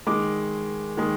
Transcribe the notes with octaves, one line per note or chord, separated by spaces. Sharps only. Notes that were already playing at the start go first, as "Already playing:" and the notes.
D#3 G#3 D6
D#3 G#3